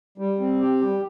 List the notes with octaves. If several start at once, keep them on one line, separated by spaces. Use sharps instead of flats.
G3
C4
G4
G3